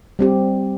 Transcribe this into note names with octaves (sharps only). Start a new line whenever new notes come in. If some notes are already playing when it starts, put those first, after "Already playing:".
G3 C4 G4